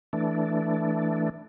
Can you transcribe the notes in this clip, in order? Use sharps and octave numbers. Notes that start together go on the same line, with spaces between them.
E3 A3 D4